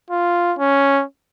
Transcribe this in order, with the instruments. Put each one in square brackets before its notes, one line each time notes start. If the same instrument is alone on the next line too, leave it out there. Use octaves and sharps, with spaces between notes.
[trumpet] F4
C#4